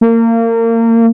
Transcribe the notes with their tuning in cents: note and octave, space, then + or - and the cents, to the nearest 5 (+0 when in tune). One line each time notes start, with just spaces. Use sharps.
A#3 -30